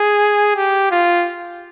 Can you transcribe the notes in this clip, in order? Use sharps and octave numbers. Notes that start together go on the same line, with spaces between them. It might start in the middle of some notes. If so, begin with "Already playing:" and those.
Already playing: G#4
G4
F4